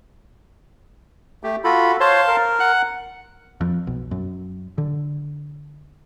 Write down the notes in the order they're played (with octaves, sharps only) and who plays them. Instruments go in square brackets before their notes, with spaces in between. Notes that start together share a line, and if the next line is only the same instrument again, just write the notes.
[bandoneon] A3 G4
[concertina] F4 B5 [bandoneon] F#4 A4
[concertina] C5 C#5 [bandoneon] F5 A5 C6
[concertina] A#4
[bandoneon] F#5 F#6
[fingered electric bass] F2
B1
F#2
D3